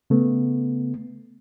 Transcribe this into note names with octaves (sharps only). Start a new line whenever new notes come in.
C#3 A3 B3